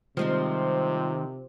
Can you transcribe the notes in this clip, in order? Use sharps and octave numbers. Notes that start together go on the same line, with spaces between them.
C3 D#3 F3 G3 G#3 C4